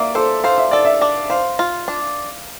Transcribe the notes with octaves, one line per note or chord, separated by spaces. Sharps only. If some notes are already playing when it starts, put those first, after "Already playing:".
Already playing: A#3 D5 E5
A4 C5
C5 F5
E5
A4 D5
E5
D4
C5 F5
F4
D4